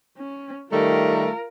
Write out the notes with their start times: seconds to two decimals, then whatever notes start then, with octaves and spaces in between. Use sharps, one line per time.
0.18 C#4
0.72 D#3 G3 A3 F4 A#4